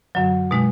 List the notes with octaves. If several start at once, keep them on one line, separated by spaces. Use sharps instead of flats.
F#2 D3 F#3
B2 G#3 D#4